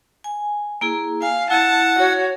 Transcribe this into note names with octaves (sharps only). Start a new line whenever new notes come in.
G#5
A#3 E4 G#4
F5 G#5
E4 F#5 A5
F#4 C#5